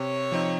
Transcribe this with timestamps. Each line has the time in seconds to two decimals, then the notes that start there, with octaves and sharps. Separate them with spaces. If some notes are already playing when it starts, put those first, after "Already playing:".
Already playing: C3 C#5
0.32 F3 C4 D#4